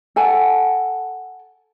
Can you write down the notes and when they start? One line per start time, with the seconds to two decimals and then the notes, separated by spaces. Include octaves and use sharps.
0.16 A4 F#5 G#5 A5